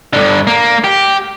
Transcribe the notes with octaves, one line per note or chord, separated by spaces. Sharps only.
G2 D3
A#3
G4